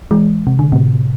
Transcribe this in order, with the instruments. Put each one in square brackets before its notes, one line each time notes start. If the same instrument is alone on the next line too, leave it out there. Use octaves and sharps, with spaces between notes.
[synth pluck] E3 G#3
C3
D3
A2 C3